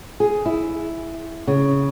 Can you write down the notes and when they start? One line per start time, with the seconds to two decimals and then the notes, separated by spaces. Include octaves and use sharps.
0.20 G#4
0.46 E4
1.47 C#3